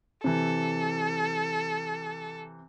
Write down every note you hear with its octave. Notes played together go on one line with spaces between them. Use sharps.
C3 E3 A4